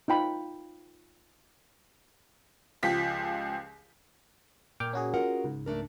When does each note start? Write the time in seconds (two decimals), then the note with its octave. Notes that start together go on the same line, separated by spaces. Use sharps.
0.08 D#4 F4 G5 B5
2.83 C#2 F3 G4 B6
4.80 A#2 G5 D6 F6
4.93 C#4 F#4 G#4
5.14 F4 A#4 F#5
5.44 C#2 G#2
5.66 A3 D4 A#4